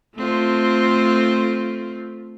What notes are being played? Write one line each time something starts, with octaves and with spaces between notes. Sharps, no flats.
A3 C4 F4